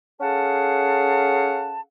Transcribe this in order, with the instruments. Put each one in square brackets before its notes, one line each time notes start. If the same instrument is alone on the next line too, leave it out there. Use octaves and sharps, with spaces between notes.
[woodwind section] C#4 G#4 A4 F5 F#5 A5